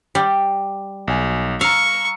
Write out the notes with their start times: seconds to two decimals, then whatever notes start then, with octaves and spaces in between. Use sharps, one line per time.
0.15 G3
1.07 B1 G#5
1.61 F5 A#5 C#6 E6